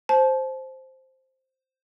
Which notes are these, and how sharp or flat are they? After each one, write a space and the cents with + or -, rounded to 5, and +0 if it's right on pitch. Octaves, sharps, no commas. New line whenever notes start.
C5 +0 A5 -30